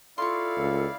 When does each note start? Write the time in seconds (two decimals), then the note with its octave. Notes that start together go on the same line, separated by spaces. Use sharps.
0.18 E4 F4 A4 D5 F5 C6 C#6
0.57 C#2